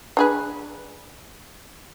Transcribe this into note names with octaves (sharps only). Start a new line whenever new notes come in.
D4 G#4 B4